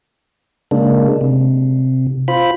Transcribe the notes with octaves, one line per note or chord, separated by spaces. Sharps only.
C#3 G#3 A#3 D4
C3
F4 C5 B5